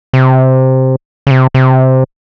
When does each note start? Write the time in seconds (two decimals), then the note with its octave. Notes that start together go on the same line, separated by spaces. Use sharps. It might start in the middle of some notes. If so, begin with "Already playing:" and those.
0.13 C3
1.27 C#3
1.31 C3
1.54 C3